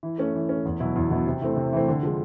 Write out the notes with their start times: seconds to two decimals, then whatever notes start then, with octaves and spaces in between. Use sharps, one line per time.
0.03 E3
0.18 A3 C#4
0.34 E3
0.49 A3 C#4
0.65 E2
0.80 B2 F#3 B3 E4
0.95 E2
1.10 B2 F#3 B3 E4
1.27 C3
1.41 E3 A3 C4
1.56 C3
1.73 E3 A3 C4
1.88 D3
2.03 F3 G#3